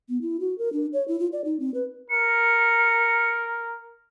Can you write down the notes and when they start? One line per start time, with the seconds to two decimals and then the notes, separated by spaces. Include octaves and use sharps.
0.09 B3
0.22 E4
0.40 F#4
0.58 A#4
0.73 D4
0.93 C#5
1.08 E4
1.20 F4
1.32 D5
1.45 D#4
1.60 C4
1.74 B4
2.10 A#4 C#7